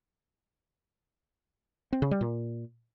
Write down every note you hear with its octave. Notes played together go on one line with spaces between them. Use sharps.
C4
C#3
G3
A#2